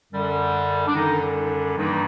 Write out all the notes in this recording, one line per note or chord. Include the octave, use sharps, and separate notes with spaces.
F#2 D3 G3
D4
F#2 D3 D#3 G3 D#4
G2 D#3 E3 G3 A#3 D#4